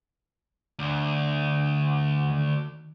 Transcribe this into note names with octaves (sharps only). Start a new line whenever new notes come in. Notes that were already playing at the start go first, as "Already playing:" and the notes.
D2
D#3